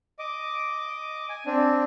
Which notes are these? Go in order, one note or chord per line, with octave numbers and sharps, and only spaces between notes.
D#5 D6
G#5
C4 D4